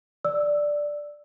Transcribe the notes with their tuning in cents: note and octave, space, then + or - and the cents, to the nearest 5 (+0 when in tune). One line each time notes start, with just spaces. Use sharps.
D5 +0 E6 +0